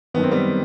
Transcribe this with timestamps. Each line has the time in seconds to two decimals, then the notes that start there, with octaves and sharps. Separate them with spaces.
0.14 F#2 D#3 B3
0.23 C4
0.31 G3 B3